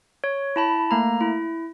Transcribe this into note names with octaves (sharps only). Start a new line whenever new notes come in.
C#5
E4 A5 B5
A3 A#3 A#5
E4